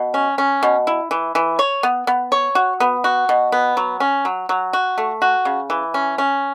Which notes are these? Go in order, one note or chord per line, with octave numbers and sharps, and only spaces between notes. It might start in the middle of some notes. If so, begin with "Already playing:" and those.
Already playing: B2
C#4
C#4
B2
E4
E3
E3
C#5
B3
B3
C#5
F#4
B3
F#4
B2
B3
F#3
C#4
F#3
F#3
F#4
A3
F#4
C#3
E3
C#4
C#4